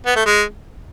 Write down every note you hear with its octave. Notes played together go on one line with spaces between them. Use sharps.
B3
A3
G#3